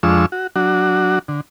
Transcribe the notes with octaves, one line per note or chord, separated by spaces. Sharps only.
F2 F3 G#3 D4 C#6 E6
F#4
F#3 D4 F#4
D3